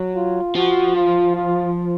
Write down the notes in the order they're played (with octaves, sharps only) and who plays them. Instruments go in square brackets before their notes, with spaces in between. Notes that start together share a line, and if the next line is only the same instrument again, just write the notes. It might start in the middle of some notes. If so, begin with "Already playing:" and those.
Already playing: [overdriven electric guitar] F#3
[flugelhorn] F4
[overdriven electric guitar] F3 [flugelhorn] F#4
[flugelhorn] F4
F4